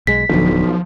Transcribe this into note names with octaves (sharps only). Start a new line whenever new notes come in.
B1 G#3 B6
D1 B1 D3 F3